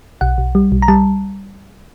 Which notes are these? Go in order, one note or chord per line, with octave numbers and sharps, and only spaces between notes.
B1 F#5
B1
G3
B1
A#5
G3 A5